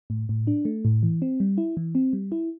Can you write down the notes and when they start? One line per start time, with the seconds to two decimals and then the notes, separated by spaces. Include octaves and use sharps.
0.10 A2
0.29 A2
0.47 D4
0.65 A3
0.85 A2
1.03 E3
1.22 C4
1.40 G3
1.58 E4
1.77 E3
1.95 C4
2.13 G3
2.32 E4